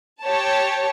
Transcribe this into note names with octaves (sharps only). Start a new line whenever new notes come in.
G4 C#5 A5